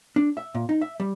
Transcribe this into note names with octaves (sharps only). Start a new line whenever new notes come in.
D4
E5
A#2
D#4
E5
G3